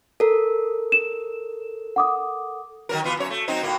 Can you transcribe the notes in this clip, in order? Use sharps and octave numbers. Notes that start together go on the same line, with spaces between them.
A4 A#4
E7
F#5 D6 D#6
D#3 F#3 A#4
E3 B3 F4
F#2 C#5
A3
F#3 C4 D#4
A2 A#3